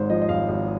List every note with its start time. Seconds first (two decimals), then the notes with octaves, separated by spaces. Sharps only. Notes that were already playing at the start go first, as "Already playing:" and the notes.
Already playing: G#1 G#2 C5 C#5
0.10 F3 D#5
0.22 D#5
0.29 G#1 F5
0.49 G#1 F5